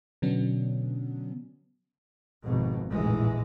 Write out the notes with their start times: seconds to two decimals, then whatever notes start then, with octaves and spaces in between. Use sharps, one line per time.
0.22 B2 D3 F#3 B3 C#4 D4
2.44 G#1 F2 B2
2.91 F1 A#1 A2 E3 G#3